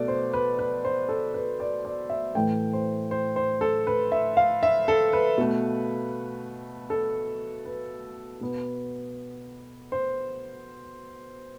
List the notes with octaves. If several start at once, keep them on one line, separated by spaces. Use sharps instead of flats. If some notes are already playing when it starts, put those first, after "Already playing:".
Already playing: B2 A3 D5
C5
B4
B4
C5
A4
B4
D5
D5
E5
A2 E3 A3 G5
C5
C5
C5
A4
B4
E5
F5
E5
A4
B4
B2 A3
A4
B4
B2 B3
C5